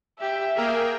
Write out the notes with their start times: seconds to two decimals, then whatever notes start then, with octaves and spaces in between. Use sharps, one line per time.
0.21 G4 E5
0.56 A#3 G#4 A#4 G5